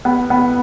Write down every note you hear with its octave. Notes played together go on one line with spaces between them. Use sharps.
B3
B3